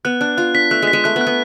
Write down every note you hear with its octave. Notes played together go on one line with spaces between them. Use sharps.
B3 F#6
D4 F#6
F4 F#6
D4 B6
A3 F#6
G#3
B6
G#3
A3 F#6
B3
F#6
B3